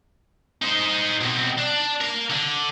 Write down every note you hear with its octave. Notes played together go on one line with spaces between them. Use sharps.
D#4 C5
B2 C4
D4
A#4 F5
D3